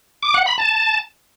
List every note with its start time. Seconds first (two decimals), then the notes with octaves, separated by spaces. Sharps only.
0.23 D6
0.34 F#5
0.46 B5
0.58 A5